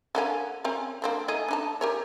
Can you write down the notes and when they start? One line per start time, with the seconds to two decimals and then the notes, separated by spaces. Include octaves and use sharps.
0.15 D3 A#3 C#4
0.64 C4 C#4 A#4
1.02 A#3 C4 D4
1.28 A3 D#4 G#4
1.48 D4 D#4 A5
1.81 G4 A#4 C#5